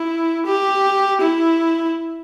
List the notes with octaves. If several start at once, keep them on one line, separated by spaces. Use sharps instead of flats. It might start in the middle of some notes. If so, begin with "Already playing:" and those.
Already playing: E4
G4
E4